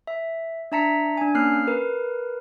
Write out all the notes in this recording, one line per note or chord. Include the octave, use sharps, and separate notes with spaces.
E5
D4 E5 A5 A#5 B6 C#7
D4 G#5
A#3 C#4 F6 F#6 C7
A#4 B4